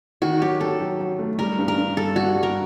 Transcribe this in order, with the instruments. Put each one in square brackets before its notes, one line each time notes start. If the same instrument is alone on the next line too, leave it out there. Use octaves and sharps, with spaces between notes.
[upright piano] D#3 [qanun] F#4
[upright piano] F#3 [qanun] G4
[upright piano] F#3 [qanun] A4
[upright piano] F#3
F#3
A3
[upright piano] G3 [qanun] A#4
[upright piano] G2
[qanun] A#4
[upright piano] G2
[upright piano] G3 [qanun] A4
[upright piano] G3 [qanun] F#4
[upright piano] G3
[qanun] A#4